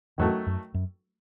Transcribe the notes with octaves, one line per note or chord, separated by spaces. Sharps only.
E2 G#2 D#3 F#3 A3
F#2
F#2